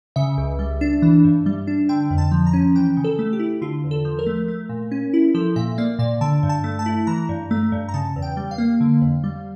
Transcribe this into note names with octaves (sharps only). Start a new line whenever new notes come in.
C#3 E5
C#2
G3
D4
E3
G2
G3
D4
D3 G5
F2
A5
F3
A#5
C#4
E3 G5
C#3
A4
A3
G4
E4
D3 F4
E2
A4
F3
A#4
A3
A3
A#2
C#4
E4
F3 A4
A#2 E5
A#3 D5
A#2 D5
D3 A5
G2
A5
A3
A5
E4
E3 A#5
G2
A3
G2
A#5
C#3 A5
E2
G5
G3
F5
A#3
D3
F2
G3